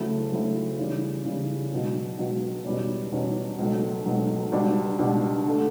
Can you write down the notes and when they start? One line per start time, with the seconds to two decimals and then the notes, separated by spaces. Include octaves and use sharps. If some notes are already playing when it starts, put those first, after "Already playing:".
Already playing: D2 C#3 F#3 A3 E4
0.32 D2 C#3 F#3 A3 E4
0.78 C#3 E3 G3
1.25 C#3 E3 G3
1.72 C#2 B2 F#3
2.19 C#2 B2 F#3
2.65 E2 B2 G3 C#4
3.12 E2 B2 G3 C#4
3.59 C#2 B2 F#3 A3
4.06 C#2 B2 F#3 A3
4.51 C#2 B2 G3 D4 F#4
4.98 C#2 B2 G3 D4 F#4
5.47 D3 A3